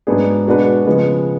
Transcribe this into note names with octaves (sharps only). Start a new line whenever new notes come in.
G#2 F#3 B3 D4 G#4
B2 G#3 D4 F#4 B4
C#3 F3 G#3 B3